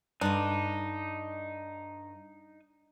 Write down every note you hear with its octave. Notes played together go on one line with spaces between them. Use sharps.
G2 D3 D4 D#4